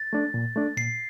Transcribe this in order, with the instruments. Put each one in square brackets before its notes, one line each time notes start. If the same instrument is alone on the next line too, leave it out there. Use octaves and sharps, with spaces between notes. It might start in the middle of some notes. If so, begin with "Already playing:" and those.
Already playing: [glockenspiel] A6
[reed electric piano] A3 D4
A#2
A3 D4
[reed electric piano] A#2 [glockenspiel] C7